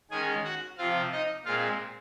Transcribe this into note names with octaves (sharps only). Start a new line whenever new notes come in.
D#3 G#3 C#4 G#4 G#5
F#4 F#5
C3 F3 C4 F4 F5
D#4 D#5
A#2 G#3 C4 F4 F5